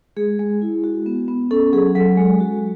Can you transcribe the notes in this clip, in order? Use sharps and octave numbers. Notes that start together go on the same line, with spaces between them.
G#3 G#4
G#3
E4
F#4
B3
B3
C#4 A4
F#3 G#4
F#3 A4
G#3
F#4